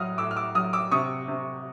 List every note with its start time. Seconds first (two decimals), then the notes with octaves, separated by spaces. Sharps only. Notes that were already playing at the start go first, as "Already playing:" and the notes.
Already playing: A2 F#3 D#6 F6
0.18 A2 D6 E6
0.31 F6
0.36 D6 E6
0.55 F#3 D#6 F6
0.73 D6 E6
0.91 C3 C#6 D#6
1.28 C3